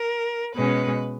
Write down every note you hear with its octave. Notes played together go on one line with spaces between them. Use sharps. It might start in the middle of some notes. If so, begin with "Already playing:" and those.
Already playing: A#4
B2 G#3 C#4 B4